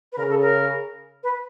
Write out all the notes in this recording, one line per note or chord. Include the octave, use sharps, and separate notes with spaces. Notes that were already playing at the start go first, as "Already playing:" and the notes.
B4
C#3 A#4
A4
A#4
B4